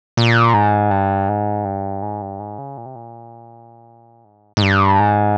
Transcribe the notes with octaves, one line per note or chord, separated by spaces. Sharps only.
A#2
G#2
G2
G#2
G2
G#2
G2
G#2
C#3
A#2
C3
A#2
G#2
G#2
G2
G#2